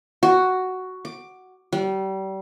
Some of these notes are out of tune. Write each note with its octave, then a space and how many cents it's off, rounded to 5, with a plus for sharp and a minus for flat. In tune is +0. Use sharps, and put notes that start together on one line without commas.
F#4 +5
D6 +10
G3 -30